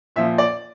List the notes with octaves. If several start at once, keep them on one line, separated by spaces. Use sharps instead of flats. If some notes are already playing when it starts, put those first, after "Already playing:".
A#2 F3 E5
D5